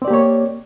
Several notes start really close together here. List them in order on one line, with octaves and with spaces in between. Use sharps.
C4 D5 G4 A#3 C#5